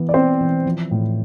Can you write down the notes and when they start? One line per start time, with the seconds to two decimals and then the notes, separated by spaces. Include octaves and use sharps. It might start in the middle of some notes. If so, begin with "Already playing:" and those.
Already playing: E3 B3
0.09 D5
0.14 B3 C4 C5
0.41 E3
0.66 F3
0.91 A2